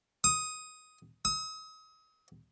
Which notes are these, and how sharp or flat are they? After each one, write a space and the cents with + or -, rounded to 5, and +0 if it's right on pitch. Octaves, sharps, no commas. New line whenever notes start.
D#6 +10
D#6 +40